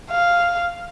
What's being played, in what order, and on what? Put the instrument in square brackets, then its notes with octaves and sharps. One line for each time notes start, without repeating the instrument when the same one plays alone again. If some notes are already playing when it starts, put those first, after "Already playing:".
[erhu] F5